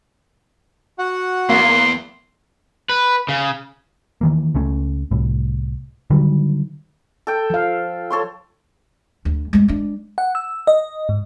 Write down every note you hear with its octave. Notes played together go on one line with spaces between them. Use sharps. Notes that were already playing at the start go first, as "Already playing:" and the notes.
F#4 F#5
E2 A#3 C6
B4
C#3
D#3 E3 A#3
C#2 A3 C#4
C2 A2
D3 D#3 F#3 G3
A4 G5
F3 F5
A4 C#5 C6
D2
G#3 A3
G#3 D4
F#5
E6
D#5
G#2